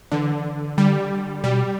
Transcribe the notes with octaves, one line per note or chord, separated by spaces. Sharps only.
D3 E3
D3 G3
B2 G3